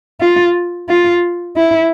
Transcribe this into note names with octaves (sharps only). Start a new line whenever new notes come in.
F4
F4
E4